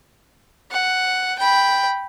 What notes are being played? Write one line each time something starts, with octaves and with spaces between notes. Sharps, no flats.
F#5
G5 B5